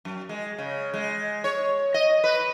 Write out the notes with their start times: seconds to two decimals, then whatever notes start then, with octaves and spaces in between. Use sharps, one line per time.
0.05 F#2
0.29 G#3
0.58 C#3
0.94 G#3
1.44 C#5
1.94 D#5
2.24 B4